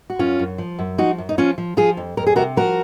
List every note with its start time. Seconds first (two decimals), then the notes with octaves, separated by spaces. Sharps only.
0.10 F#4
0.19 F#2 C#4 F4
0.39 F#2
0.58 F3
0.79 F#2
0.98 F3 D#4 F#4
1.18 F#2
1.29 D#4
1.38 F3 C#4 F4
1.58 F3
1.77 F3 F4 G#4
1.97 F2
2.17 F2 A#4
2.27 G#4
2.36 C3 F#4 A#4
2.57 F3 F#4 A#4